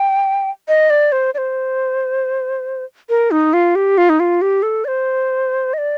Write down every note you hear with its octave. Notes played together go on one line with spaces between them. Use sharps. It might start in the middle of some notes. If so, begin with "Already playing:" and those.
Already playing: G5
D#5
D5
C5
D5
C5
A#4
D#4
F4
G4
F4
D#4
F4
G4
A4
D5
C5
D#5
D5